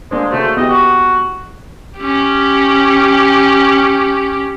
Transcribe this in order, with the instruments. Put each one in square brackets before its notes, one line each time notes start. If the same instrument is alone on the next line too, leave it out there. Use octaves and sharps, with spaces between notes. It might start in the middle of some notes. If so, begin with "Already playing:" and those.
[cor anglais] G#3 [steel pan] A#3 D4 C5
[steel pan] C#3 F#4 C5 [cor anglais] A3
[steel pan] B3 E4 G4 [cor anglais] D#5
[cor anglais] F#4
[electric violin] C#4 G4